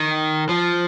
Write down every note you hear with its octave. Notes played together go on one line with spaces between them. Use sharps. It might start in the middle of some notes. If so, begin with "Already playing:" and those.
Already playing: D#3
F3